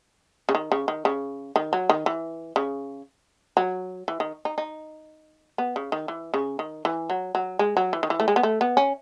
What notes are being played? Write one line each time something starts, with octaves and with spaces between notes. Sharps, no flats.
C#3
D#3
C#3
D#3
C#3
D#3
F#3
D#3
E3
C#3
F#3
E3
D#3
D#4
D#4
B3
C#3
D#3
E3
C#3
D#3
E3
F#3
F#3
G#3
F#3
E3
D#3
E3
A3
G#3
B3
A3
B3
C#4